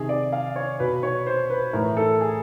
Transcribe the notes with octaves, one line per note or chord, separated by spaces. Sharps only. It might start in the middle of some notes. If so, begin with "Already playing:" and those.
Already playing: C3 D#3 G#4
D5
F5
C#5
B2 B4
C#5
C5
B4
A2 E3 A#4
A4
G#4